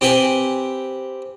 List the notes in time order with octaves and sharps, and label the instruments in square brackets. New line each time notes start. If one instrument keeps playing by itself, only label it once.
[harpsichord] C4 G4 B4 G5 G#5